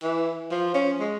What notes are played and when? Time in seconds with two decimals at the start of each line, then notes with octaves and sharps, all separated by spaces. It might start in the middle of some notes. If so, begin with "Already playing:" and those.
0.03 E3
0.51 F3
0.74 C#4
1.00 G#3